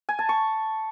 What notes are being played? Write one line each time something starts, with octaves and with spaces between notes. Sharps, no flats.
G#5
A5
C#6